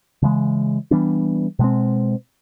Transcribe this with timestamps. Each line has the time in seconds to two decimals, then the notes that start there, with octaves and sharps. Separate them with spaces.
0.22 C#3 E3 G#3
0.91 E3 G3 B3 D4
1.59 B2 G#3 C4